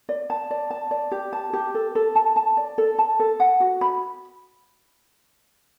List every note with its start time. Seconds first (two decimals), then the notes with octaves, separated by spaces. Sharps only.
0.09 D5
0.30 A5
0.51 D5
0.70 A5
0.91 D5
1.12 G4
1.33 A5
1.53 G4
1.75 A4
1.95 A4
2.15 A5
2.36 A5
2.57 D5
2.78 A4
2.98 A5
3.20 A4
3.40 F#5
3.60 F#4
3.81 B5